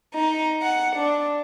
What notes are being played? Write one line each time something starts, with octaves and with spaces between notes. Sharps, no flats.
D#4
F#5
D4